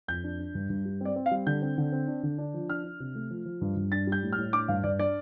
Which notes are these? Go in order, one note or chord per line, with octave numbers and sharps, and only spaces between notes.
F2 G6
D4
D4
G2
G2
G3
C4 D5
C4
F5
G3
D3 G6
C4
D3
C4
D4
D3
D4
F3
D4 F6
D4
C3
A3
F3
F3
G2
G2
D4 A6
G3
G6
A2
F6
A2
D4 D6
G2 F5
G2 D5
D4 D5